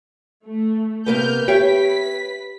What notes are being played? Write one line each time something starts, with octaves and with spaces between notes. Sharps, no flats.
A3
C3 A#3 B3 F6 G6
G4 B4 C#5 E5 G5 B6